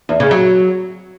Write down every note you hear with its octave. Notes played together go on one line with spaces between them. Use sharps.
E2
C#3
F#3